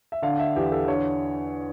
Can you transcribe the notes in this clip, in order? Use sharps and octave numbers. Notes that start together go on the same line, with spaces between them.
E5
D3 F5
E5
E2 G4
A4
D3 C#5